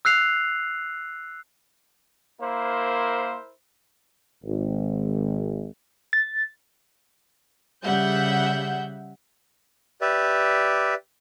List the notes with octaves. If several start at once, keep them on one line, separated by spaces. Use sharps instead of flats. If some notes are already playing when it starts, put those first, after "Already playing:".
E6 F#6 C7 F7
A#3 E4 A#4 C5
G#1
A6
C#3 G3 E5 F#5 G6
G4 B4 D5 E5